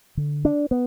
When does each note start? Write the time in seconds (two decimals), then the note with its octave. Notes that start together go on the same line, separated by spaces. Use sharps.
0.17 D3
0.45 D4
0.71 B3